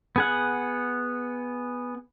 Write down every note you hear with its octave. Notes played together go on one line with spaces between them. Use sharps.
B3 G#4 F#5